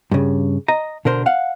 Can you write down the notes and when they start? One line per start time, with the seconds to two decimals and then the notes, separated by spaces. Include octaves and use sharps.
0.11 G2 C#3
0.68 D#5 A#5
1.05 B2 D3 A#4 C5
1.26 F5 F#5